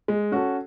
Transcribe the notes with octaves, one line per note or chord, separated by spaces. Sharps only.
G#3
C#4 F#4 A4